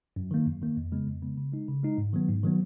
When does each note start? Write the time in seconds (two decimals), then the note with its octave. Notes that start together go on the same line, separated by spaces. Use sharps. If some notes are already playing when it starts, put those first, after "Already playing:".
0.16 F#2
0.31 D#3 A#3
0.46 F#2
0.62 D#3 A#3
0.77 F2
0.92 C#3 G#3 B3
1.07 F2
1.22 C#3 G#3 B3
1.37 C#3
1.52 G#3 D#4
1.68 C#3
1.83 G#3 D#4
1.98 G#2
2.13 D#3 F#3 B3
2.29 G#2
2.43 D#3 F#3 B3